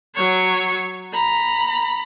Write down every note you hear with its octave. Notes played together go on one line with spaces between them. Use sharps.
F#3 C#5
A#5 B5